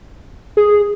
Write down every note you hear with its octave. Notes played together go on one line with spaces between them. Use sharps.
G#4